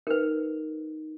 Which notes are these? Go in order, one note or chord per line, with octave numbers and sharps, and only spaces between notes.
D#4 A#4 B4